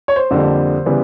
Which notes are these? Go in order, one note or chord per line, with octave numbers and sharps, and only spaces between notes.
C#5
C5
F2 D3 G3 A#3 D4
C#3 E3 G3 B3